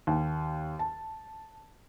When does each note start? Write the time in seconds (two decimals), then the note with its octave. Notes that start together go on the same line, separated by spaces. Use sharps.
0.07 D#2
0.79 A5